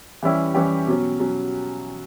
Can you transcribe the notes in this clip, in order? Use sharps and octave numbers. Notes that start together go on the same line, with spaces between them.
E3 G3 C#4 E4 G4
E3 G3 C#4 E4 G4
B2 F#3 C#4
B2 F#3 C#4